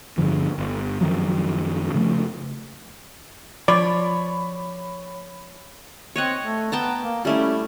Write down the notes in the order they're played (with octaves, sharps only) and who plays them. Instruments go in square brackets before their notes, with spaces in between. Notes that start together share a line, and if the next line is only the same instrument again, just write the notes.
[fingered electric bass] G1 G2 D3 F3
G1
F#2 D#3 F3 F#3
C#3 F3 A3
[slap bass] F3 [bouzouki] C#5 [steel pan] D5 [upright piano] B5
[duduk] C4 [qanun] C#5 D#5 F#5
[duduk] A3
[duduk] B3 [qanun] G5 A5 A#5
[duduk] A#3
[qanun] G3 A3 E4 [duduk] C#4